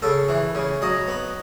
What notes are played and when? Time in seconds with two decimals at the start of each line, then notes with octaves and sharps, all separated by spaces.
0.02 C#3 A4
0.29 E3
0.55 C#3
0.82 F#3 D#5
1.08 B3